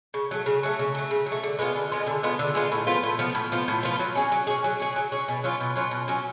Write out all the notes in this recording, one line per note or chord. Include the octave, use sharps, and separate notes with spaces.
C#3
F#3 A3
C#3
F#3 A3
C#3
F#3 A3
C#3
F#3
A3
D3
G#3 B3 F4
D3
G#3 B3 F4
D3
G#3 B3 F4
D3
G#3 B3 F4
A2
F3 B3 F4
A2
F3 B3 F4
A2
F3 B3 F4
A2
F3 B3 F4
F#3
C#4 G#4
F#3
C#4 G#4
F#3
C#4 G#4
F#3
C#4 G#4
B2
F#3 C#4 F4
B2
F#3 C#4 F4
B2
F#3 C#4 F4